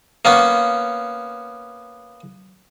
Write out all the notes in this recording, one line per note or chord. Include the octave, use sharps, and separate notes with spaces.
A#3 B3 C#4